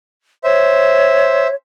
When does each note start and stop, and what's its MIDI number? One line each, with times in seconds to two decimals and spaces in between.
0.44 1.48 72
0.44 1.55 73
0.44 1.48 76